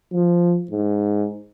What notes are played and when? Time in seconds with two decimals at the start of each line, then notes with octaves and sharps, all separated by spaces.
0.12 F3
0.71 G#2